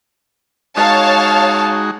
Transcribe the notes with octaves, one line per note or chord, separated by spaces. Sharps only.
G#3 D#4 F#4 C#5 F5 A5